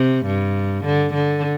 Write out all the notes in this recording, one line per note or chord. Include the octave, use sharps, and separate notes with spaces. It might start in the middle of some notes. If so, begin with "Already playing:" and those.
Already playing: C3
G2
D3
D3